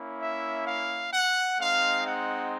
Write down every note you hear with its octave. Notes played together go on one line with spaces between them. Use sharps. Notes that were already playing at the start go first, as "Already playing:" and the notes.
Already playing: A#3 C#4 E4
E5
F5
F#5
G#3 C4 D#4 F5
F#5